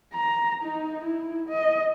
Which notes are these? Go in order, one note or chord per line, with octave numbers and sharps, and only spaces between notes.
A#5
D#4
E4
D#5